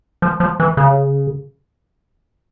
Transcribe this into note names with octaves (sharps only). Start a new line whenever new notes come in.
F3
F3
E3
C#3